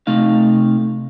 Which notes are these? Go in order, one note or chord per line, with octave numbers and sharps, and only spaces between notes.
C3 A3 D#4 F5